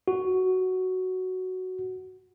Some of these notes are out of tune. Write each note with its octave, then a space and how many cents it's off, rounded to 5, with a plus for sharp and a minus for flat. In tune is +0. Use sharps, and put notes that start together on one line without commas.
F#4 +5